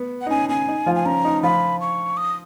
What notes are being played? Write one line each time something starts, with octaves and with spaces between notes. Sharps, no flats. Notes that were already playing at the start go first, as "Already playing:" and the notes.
Already playing: B3 B4
F#5
D#4
C#4 G#5
C#4 G#5
D#4
F3 F4
G#5
C#4 A#5
D#4
F3 F4 B5
C#6
D#6